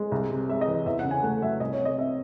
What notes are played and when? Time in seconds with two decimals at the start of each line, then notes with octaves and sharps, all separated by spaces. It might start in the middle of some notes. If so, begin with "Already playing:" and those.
Already playing: G#3
0.12 C2
0.30 C3
0.49 G#3 E5
0.61 D#5
0.68 E3
0.86 E2 E5
0.99 F#5
1.04 C#3
1.11 G#5
1.23 A3 F#5
1.43 F#3 E5
1.60 C2 D#5
1.73 C#5
1.79 C3
1.85 D#5
1.98 C4 E5